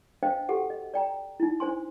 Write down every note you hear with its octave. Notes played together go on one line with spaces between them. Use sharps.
D4 C5 D#5 F5 G5
F#4 G4 A4 F#5
D#5
D5 G5 A#5
D#4 E4
D4 C5 G#5 C6